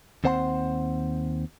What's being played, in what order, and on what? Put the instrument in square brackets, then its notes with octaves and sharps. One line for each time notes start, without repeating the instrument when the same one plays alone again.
[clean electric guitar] D#2 C4 C5 F#5 G#5 C6